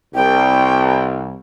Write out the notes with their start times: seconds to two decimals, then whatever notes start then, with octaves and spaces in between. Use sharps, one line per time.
0.15 C2 G5